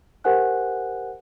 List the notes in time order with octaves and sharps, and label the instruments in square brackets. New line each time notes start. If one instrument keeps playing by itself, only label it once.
[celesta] G4 A#4 C5 F#5 G#5 F#6